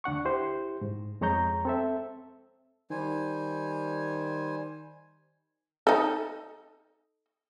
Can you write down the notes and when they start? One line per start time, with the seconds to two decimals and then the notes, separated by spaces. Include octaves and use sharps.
0.04 D2 D4 F#5 C#6
0.25 E4 G4 C5
0.81 G#2
1.21 F2 G#3 G#4 C#5 A#5 G6
1.65 C4 A4 E5
2.90 D#3 G3 C5 G#5
5.87 D#4 A4